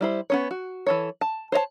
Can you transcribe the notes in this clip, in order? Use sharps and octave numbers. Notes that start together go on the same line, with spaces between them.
G3 E4 C5
B3 C#4 C#5
F#4
E3 A4 C#5
A5
C5 C#5 D#5 A5